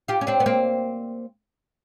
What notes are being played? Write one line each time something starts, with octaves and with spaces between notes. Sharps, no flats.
F4 G4
C#4
C4 D4
B3
A#3 C4